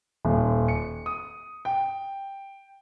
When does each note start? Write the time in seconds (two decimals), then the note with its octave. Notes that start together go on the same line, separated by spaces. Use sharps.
0.25 D#1
0.68 C#7
1.06 D#6
1.65 G5